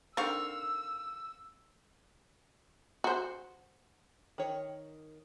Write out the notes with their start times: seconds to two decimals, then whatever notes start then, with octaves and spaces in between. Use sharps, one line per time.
0.17 D3 D#3 C4 F5 C#6 E6
3.04 F#4 C5
4.38 D#3 C#5